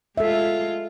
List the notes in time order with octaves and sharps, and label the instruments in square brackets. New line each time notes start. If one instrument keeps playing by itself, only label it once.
[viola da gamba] G#3 F4 [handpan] A4 E5